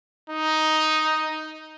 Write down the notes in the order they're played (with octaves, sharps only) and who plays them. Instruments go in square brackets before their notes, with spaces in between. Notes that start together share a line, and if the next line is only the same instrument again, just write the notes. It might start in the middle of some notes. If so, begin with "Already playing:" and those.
[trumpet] D#4